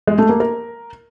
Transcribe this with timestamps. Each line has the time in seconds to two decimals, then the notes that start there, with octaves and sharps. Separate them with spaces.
0.07 G#3
0.18 A3
0.29 A#3
0.40 A#4